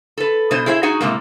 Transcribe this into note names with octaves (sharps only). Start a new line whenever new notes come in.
A4 B4
B2 G3 C5 D#5
E4 G#4 C5 E5
D#4 F#4 G#4 F#5
A2 C3 G#3 A#3